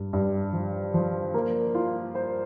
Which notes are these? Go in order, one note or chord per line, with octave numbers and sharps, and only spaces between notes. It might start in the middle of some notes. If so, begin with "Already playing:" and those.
Already playing: G2
G2
F3
F3
A#3
F4
C5